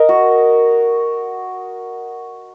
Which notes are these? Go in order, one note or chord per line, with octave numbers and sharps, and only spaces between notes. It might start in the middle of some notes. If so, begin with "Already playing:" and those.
Already playing: A#4 D#5
F#4